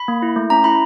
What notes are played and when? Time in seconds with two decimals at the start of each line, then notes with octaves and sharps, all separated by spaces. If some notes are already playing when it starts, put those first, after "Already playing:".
Already playing: B5
0.08 A#3
0.22 E4
0.36 A3
0.50 C#4 A#5
0.64 E4 B5